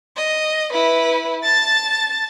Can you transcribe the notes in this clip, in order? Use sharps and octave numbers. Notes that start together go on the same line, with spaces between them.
D#5
E4 B4
A5 A6